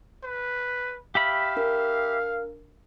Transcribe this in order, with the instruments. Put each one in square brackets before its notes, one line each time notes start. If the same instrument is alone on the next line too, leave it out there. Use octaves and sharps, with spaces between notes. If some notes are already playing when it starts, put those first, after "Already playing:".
[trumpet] B4
[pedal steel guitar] G4 E5 B5 [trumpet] F5
[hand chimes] D4 A#4